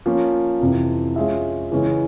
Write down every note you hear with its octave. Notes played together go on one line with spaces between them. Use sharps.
F3 A#3 C#4
F2 C3 E3
G#3 C#4 F4 G#4 E5
C#3 E3 G#3 C#4